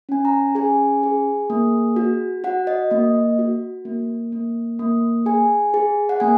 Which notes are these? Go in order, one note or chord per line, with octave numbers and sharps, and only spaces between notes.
C#4 G#5
A#5
G#4 G#5
G#4
A#3
F#4
F#4 F#5
D#5
A#3 D#5
F#4
A#3
A#3
A#3
G#4 G#5
G#4
F#5
A#3 G#5